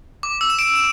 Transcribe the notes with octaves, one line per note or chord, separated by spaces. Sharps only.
D6
E6
E7
D7
E7